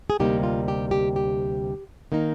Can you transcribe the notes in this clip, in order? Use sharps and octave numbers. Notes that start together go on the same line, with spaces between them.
G#4
D2 C3 G3 A#3 D#4 G4
F4
G4
G4
G4
D#3 A#3 D#4